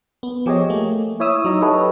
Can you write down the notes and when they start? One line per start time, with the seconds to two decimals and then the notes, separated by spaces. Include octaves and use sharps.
0.23 B3
0.46 F3 G4 G#4 C#5 D#5
0.70 A3 A#3
1.20 E4 C#5 E5 D#6 E6
1.44 F#3 D#4 D#5
1.62 G4 A4 B4 C#5 D#5